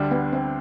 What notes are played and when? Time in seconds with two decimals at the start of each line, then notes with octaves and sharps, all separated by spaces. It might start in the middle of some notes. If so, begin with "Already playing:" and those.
Already playing: D2 D3 G3 D4
0.11 B3
0.33 C4